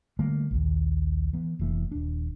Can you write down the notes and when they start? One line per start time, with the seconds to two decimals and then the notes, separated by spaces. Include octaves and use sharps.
0.19 D3 G3 A3 A#3
0.51 A#1 D#2
1.33 E3 B3
1.59 F1 E3 A#3
1.92 D#1 D4